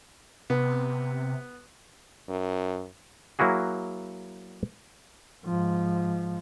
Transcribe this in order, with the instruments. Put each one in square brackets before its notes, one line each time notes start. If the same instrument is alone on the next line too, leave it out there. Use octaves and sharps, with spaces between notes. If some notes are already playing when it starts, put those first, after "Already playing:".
[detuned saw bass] C3 [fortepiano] B3
[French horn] F#2
[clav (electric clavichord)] F#3 A#3 E4 F#4 G#4
[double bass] G#2 F3